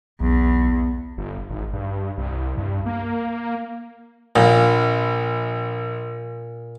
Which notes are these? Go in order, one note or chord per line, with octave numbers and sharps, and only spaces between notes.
B1 E2
G1
G#1
G2
C2
G2
A#3
A#1 A#2